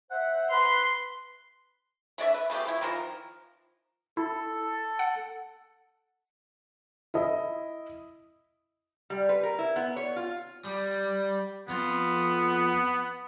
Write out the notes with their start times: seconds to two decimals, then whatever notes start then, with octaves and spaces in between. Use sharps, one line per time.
0.10 C5 E5 F#5
0.50 B4 C6
2.18 A3 D4 D5 E5
2.34 B4
2.50 C#3 A3 B3 G4
2.65 F3 E4
2.81 D#3 F3 D4 A#4
4.17 E4 A4
4.99 F#5
7.14 E4 D#5
9.10 G3
9.29 B4
9.43 A#4
9.58 E4
9.76 B3
9.96 C#5
10.16 F4
10.64 G3
11.68 F2 B3 F4